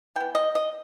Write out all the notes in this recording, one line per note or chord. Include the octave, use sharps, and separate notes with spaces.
E3 B3 G5
D#5
D#5